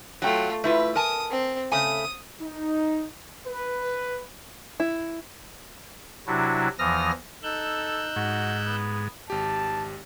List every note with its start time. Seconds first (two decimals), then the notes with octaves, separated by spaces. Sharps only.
0.22 F#3 A3 F4 G5
0.64 A3 E4 F4 B4
0.96 A#4 G#5 A5 D#6
1.30 C4
1.72 C#3 A3 G#5 D#6
2.42 D#4
3.46 B4
4.80 E4
6.27 C3 F#3 D4 E4 F#4
6.79 E2 E3 F3 D#6 F6 A#6
7.43 D#4 A4 E6 F#6 G6
8.16 G#2 F#4
8.66 B3
9.30 G#1 G4 A5